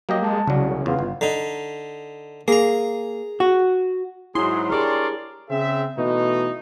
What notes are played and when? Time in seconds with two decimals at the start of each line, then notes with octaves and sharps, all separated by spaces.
0.09 F#3 A#3 G4 D#5
0.22 G#3 A5
0.47 C2 C#3 F#3 D4
0.68 F#2
0.86 E2 B3 F4
0.99 G1
1.21 D3 D#4
2.48 A#3 G#4 A#5
3.40 F#4
4.35 G#2 F#3 E4 G#4 C6
4.70 D4 G4 G#4 A#4 C#5 D5
5.50 C#3 C4 G#4 E5
5.97 B2 E3 A3 D#4